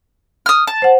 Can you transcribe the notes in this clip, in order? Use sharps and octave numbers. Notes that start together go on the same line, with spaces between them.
D#6 F6
A5
C5 F#5